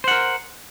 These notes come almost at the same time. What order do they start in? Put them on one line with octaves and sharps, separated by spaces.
C5 F#5 A#4